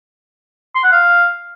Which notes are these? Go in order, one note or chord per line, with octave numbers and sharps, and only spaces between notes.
C6
F#5
F5